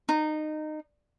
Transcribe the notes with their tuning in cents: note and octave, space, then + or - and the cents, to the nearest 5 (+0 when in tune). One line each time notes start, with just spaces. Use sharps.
D#4 -20